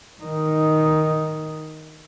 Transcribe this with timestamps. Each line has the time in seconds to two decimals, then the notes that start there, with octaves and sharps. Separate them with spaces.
0.23 D#3 D#4